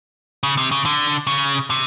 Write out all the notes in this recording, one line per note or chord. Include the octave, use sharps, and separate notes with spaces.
C#3
C3
C#3
D3
C#3
C3